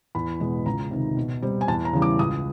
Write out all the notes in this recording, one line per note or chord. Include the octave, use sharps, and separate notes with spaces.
E2 B5
B2 G#3 B3
C#2 A#5
C3 D#3
B2
G3 C4
G#5
E2 A5
A#5
C#3 E3 G3
D6
C#2 D#6